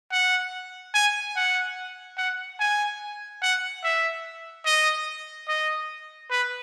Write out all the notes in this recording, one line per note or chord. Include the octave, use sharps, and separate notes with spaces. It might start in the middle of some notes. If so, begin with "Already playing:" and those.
F#5
G#5
F#5
F#5
G#5
F#5
E5
D#5
D#5
B4